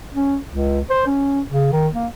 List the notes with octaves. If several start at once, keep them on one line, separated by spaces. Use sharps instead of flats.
C#4
C#2
C5
C#4
C#3
D#3
A#3